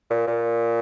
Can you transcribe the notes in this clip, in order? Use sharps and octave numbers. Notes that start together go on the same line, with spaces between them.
A#2
A#2